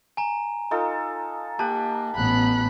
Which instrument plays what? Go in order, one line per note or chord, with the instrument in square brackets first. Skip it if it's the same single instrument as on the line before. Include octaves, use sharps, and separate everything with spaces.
[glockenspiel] G#5 A#5
[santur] D#4 F4 A4
[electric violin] A#3 [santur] G4 F#5 [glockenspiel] A5
[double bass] A1 B3 [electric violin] B5 F#6